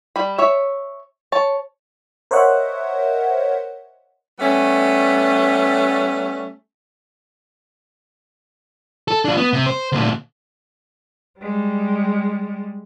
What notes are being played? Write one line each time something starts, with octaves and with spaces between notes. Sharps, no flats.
G3 B5
C#5 E5
C#5 A5
A#4 C5 C#5 D#5 E5 F#5
G3 A3 B3 C#4
A4
D4 F4
B3
C3
C5
D2 A#2
G3 G#3